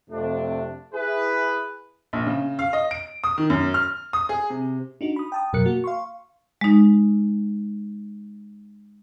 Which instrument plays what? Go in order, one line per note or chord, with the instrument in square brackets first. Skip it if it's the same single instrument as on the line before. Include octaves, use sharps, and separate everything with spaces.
[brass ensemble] F2 C3 A3 D4
E4 G#4 B4
[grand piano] A#1
C#3
F5
D#5
D7
D#6
D#3
F#2
F6
D#6
G#4
C3
[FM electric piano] D4 D#4 F#4
B5 D#6
G5 A5 D#6
F#2 B2 F#3 A#4 F#6 C#7
A#3 F#4
F5 C6 C#6
[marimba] G#3 D#4